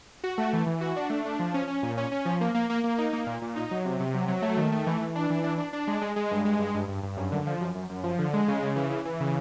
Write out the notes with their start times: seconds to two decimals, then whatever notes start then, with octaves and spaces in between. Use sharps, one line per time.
0.24 F#4
0.38 A3
0.53 E3
0.66 E3
0.81 F#4
0.96 D4
1.10 A3
1.25 D4
1.39 F3
1.54 C#4
1.68 C#4
1.83 A#2
1.98 C#4
2.12 C#4
2.25 F3
2.41 A#3
2.55 A#3
2.70 A#3
2.84 A#3
2.98 D#4
3.13 A#3
3.27 A#2
3.42 A#2
3.56 D#4
3.71 F#3
3.85 C3
4.00 C3
4.14 F#3
4.28 F#3
4.42 A3
4.57 D#3
4.72 A3
4.87 E3
5.00 E3
5.15 D4
5.30 E3
5.44 D4
5.58 D4
5.73 D4
5.88 G#3
6.01 G#3
6.16 G#3
6.31 G2
6.45 G#3
6.59 G2
6.74 G2
6.88 G2
7.03 G2
7.17 F#2
7.32 D3
7.47 F3
7.61 F#2
7.75 F#2
7.90 F#2
8.04 F3
8.19 D3
8.33 G#3
8.48 C#3
8.63 C#3
8.76 E3
8.90 E3
9.05 E3
9.20 C#3